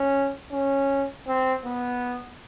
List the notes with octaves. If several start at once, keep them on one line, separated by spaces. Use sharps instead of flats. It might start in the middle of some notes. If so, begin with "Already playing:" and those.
Already playing: C#4
C#4
C4
B3